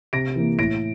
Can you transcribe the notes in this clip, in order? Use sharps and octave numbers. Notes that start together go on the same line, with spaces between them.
C3 A#6 D7
E3 A#3
A2 A#6 D7